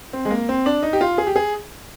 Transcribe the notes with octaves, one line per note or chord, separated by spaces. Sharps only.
C4
G#3
A#3
C4
D4
D#4
G4
F4
G#4
G4
G#4